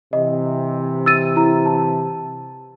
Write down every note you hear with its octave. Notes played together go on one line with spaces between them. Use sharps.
C3 E3 D#5
E6 A6 D#7
E4 A#5
A5